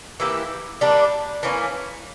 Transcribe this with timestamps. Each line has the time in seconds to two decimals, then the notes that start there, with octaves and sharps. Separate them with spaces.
0.20 E3 A#3 E4 G4
0.81 G3 A#3 D4
1.43 E3 A#3 C#4